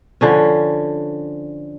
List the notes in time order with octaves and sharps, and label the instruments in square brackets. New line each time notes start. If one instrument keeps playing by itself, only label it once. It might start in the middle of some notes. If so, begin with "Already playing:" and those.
[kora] D3 F3 C#4